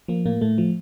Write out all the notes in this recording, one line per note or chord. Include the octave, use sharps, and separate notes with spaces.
F3 A#3
A2 A#3
A2 A3
F3